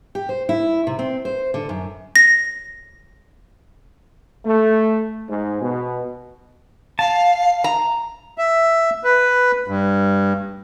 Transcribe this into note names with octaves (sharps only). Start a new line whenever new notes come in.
G4
C5
E4
C3
C4
C5
D3
F#2
A#6
A3
G#2
B2
F5 A5
A#5
E5
B4
G2